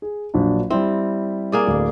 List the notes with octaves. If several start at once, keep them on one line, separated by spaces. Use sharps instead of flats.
G#4
A#1 F#3 D4
G3 C4 E4
A#3 G#4 D5
D1